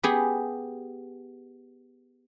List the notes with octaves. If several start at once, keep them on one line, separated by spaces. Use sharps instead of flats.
B3 G4 G#4